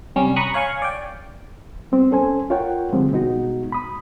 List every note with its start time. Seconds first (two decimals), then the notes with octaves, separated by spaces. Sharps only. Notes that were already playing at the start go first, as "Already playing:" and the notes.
0.16 C3 G3 C#4
0.36 A#5 B5 C#6 D#6 F#6
0.54 C#5 F5 G#5 C#6
0.82 D5 G5
1.92 G3 B3 C4
2.11 C#4 A4 C5 G#5
2.50 F4 A#4 C#5 F#5 G5
2.93 D3 F3 G3 G#3 C4
3.11 B2 G#3 B3 D#4 F#4
3.72 B5 D#6